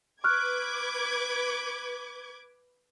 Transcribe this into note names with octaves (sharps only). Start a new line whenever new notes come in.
B4 C#6 D6 F6 F#6 G#6